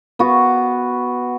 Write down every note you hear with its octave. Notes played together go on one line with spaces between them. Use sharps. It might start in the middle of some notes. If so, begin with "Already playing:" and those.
B3 F#4